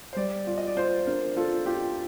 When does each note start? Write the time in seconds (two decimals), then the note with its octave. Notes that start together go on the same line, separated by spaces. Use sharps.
0.13 C5
0.16 G3 D5
0.47 F4 D5
0.57 D#5
0.67 D5
0.77 F4 C5
1.06 D4 A#4
1.36 F4 A4
1.66 F4 G4